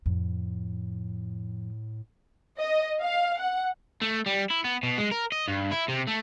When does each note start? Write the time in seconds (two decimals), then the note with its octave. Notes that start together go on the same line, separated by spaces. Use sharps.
0.06 F2 A2
2.59 D#5
3.01 F5
3.39 F#5
4.02 A3
4.26 G3
4.50 E4
4.64 B3
4.83 B2
4.98 G#3
5.11 A#4
5.32 D#5
5.48 G2
5.71 E4
5.88 C3
6.07 A3